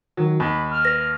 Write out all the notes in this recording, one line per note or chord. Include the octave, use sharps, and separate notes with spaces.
D#3 F#3
D#2 B5
F6
B4 A#6